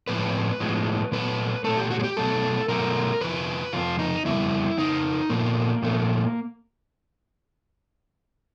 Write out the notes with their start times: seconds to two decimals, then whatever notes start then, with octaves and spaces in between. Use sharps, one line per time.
0.08 A2 F3 G#3 B4
0.60 A2 F3 G#3
1.12 A#2 F#3 A3 B4
1.64 A#2 F#3 A3 A4
1.77 G4
1.91 F#4
2.00 G#4
2.03 G4
2.17 B2 F#3 A3 A4
2.68 B2 F#3 A3 A#4
3.21 F2 C3 F3 B4
3.73 F2 C3 F3 F4
3.99 D#4
4.25 F2 C#3 G3 E4
4.78 F2 C#3 D#4
5.30 A#2 F3 A3 A#3
5.82 A#2 F3 A3